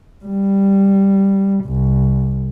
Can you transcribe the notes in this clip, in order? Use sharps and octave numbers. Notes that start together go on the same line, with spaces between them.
G3
C2